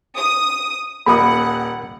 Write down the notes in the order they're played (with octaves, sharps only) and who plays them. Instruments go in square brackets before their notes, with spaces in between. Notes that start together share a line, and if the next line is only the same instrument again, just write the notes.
[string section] D#6
[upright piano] D#1 A#3 D#6 [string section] F#5 [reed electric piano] B5